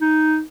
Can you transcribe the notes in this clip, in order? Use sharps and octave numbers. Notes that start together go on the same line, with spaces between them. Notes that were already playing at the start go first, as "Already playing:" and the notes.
D#4